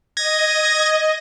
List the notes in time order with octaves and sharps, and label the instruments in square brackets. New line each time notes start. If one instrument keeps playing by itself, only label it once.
[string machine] D#5 [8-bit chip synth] G#6 A#6